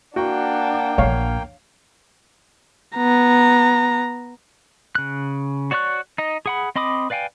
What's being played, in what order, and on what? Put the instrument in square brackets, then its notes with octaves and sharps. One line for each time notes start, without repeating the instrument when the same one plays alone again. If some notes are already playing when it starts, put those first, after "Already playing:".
[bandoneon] A#3 G5 [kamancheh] D4 F#5 [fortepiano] F#4
[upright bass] A#1 F3 [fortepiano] C#5 F5
[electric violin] B3 A#5
[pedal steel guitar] C#3 F#6
F#4 C#5 D5 C#6 F#6
D#4 D#5
G#4 F#5 B5
C4 D#5 B5 D6 D#6
B4 D5 F5 G5 G#5